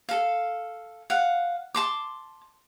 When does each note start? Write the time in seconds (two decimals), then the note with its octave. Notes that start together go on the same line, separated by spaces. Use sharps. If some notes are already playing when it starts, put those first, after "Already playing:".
0.09 A4 F5
1.10 F5 F#5
1.75 A5 C6 D6